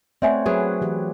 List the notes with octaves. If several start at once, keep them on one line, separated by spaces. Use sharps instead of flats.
A3 C4 C#5 D5 E5 F#5 G#5
F#3 G#4 B4
E3 G4